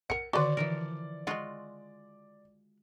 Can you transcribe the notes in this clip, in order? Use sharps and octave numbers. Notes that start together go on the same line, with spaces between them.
A#4 F#5 C#7
D3 D#3 F#4 B4 D5 D6
E3 F3 A#4
G#3 F4 F#4 D#5 F#5